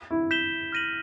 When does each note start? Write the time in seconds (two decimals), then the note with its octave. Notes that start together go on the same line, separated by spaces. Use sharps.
0.10 E4
0.31 G6 B6 E7 G7
0.72 F6 A#6 D#7 F#7